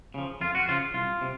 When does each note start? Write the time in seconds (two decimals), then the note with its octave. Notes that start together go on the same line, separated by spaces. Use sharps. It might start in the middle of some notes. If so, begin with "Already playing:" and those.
0.14 C#3 F3
0.41 F2 F4
0.55 F#4
0.68 C#3 F3 F4
0.94 C2 F4
1.21 C3